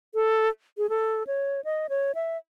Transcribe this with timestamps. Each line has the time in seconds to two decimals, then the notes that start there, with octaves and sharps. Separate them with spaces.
0.14 A4
0.78 G#4
0.89 A4
1.27 C#5
1.65 D#5
1.89 C#5
2.15 E5